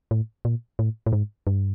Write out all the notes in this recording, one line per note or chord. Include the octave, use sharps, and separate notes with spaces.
A2
A#2
A2
A2
G#2
G2